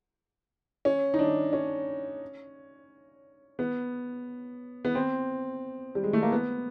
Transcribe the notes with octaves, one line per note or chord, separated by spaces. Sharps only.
C#4
D#4
D4
C#4
B3
B3
C4
G3
G#3
A3
A#3
B3